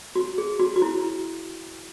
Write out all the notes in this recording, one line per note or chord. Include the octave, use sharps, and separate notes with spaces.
F#4
G#4
F#4
F#4
E4